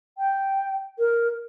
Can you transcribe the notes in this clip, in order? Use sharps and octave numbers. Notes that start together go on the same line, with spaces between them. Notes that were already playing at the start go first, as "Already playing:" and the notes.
G5
A#4